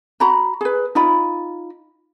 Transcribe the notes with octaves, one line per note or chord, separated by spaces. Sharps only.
F#4 A#5 B5
G#4 B4
D#4 F4 B5